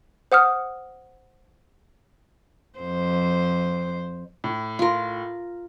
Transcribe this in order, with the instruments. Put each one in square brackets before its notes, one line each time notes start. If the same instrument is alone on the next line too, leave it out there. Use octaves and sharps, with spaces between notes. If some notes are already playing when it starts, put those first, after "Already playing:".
[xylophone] C5 F#5 D#6 F6
[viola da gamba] F2 C5
[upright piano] A2
[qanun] F4 A#4 [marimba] F5 C6